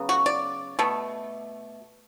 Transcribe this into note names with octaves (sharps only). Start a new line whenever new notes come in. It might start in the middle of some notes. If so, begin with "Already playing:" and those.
Already playing: C#3 F#3 B3
F#4
D5
B2 A3